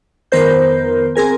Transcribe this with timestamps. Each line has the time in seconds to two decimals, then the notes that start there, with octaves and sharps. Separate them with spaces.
0.32 F2 D#3 B3 A#4 C5 G6
1.15 C4 G#4 A#4 G#5